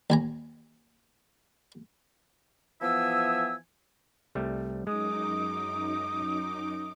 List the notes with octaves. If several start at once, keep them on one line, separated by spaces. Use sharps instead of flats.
D#2 G#5 A#5
E3 F3 B3 E5 G#5 E6
C2 G3 A3
F#2 G#3 D#4 D6 D#6